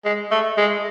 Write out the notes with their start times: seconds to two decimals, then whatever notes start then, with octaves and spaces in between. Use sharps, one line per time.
0.05 G#3
0.31 A3
0.57 G#3